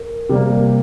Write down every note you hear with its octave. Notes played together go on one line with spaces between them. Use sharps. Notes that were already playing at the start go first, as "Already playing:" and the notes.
Already playing: A#4
C3 G3 A#3